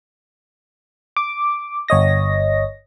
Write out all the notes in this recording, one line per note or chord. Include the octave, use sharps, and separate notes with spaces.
D6
G1 C#5 D#5 A#6